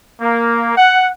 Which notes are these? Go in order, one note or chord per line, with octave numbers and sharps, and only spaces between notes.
A#3
F#5